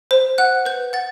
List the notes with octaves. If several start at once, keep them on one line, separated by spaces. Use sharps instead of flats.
C5
F#5 F#6
B4 G6
F#5 A6